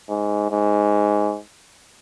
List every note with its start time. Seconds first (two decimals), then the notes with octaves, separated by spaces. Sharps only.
0.09 G#2
0.51 G#2